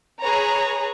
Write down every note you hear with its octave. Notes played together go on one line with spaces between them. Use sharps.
G#4 B4 C#5 A#5